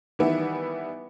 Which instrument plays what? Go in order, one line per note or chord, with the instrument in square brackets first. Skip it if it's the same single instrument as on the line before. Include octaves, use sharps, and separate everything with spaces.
[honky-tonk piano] D#3 E3 G3 B3 E4